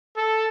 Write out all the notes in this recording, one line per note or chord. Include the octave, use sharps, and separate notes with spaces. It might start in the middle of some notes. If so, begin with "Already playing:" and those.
A4